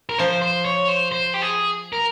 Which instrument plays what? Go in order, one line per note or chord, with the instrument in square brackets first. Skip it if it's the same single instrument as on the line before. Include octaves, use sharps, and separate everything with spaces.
[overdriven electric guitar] A#4
[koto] F3 [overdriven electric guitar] C5
[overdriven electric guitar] C5
C#5
C5
C5
G4
G#4
A#4